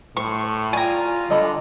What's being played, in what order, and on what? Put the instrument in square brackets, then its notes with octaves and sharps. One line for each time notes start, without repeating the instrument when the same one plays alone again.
[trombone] A2 [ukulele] C5 [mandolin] C#6
[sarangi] F4 [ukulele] D5 G5 [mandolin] G#5 A#5
[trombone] D3 [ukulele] A4 D#5 B5